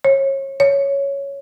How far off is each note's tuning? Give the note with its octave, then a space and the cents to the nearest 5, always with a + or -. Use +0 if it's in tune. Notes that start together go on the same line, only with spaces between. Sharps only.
C#5 -30
C#5 +5